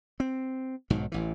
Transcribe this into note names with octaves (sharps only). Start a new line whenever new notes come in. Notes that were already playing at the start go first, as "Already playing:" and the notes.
C4
B1 G#2 D#3 F#3
A1 E3